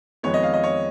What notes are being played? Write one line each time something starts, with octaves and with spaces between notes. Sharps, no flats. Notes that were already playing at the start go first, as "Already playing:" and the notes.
F2 D#3 G#3 B3 C#5
D#5
F5
D#5
C#5